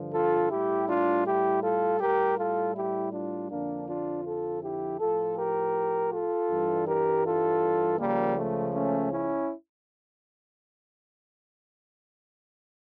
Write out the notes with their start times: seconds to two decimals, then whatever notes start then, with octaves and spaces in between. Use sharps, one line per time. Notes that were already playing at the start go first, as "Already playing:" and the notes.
Already playing: G2 D3 F3
0.12 F4 A4
0.50 A2 G3 E4 G4
0.88 D4 F4
1.25 E4 G4
1.62 F4 A4
2.00 A2 G3 G4 A#4
2.37 F4 A4
2.75 E4 G4
3.12 D4 F4
3.49 F2 D3 F3 A#3 D4
3.87 D4 F4
4.25 F4 A4
4.63 E4 G4
4.99 A2 F3 F4 A4
5.36 G4 A#4
6.11 F4 A4
6.49 G2 E3 G3
6.86 G4 A#4
7.24 F4 A4
7.98 C#2 C#3 F3 G3 A#3
8.36 A3
8.73 A3 C#4
9.11 C#4 E4